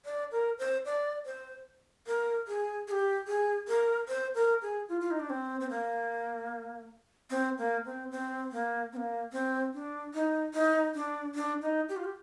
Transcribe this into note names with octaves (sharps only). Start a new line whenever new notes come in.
D5
A#4
C5
D5
C5
A#4
G#4
G#4
G4
G#4
A#4
C5
A#4
G#4
F4
F4
D#4
D4
C4
C4
A#3
C4
A#3
C4
C4
A#3
C4
A#3
C4
D4
D#4
D#4
D4
D4
D#4
G4
F4
G4